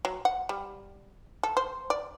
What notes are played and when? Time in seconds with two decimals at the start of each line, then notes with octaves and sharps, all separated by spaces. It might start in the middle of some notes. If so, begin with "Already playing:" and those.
0.05 F#3
0.25 F#5
0.49 G3
1.43 A4
1.57 C5
1.90 D5